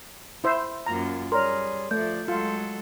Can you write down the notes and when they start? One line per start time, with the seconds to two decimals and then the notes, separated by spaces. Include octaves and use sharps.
0.44 E4 C5 E5
0.86 F#2 A#3 F4 A#5
1.32 G3 G#4 A#4 C#5 D5 C6
1.91 F3 A3 D5 G6
2.28 F#3 G#3 F4 A4